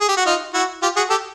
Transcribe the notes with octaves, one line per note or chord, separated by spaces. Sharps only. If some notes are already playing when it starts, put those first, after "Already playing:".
G#4
G4
F#4
D#4 F4
E4 F#4
F4 G4
F#4 G#4
G4 A4